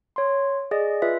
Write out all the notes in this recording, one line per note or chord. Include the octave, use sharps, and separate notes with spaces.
C#5 C6
G#4 D5 D#5
F4 B4 E5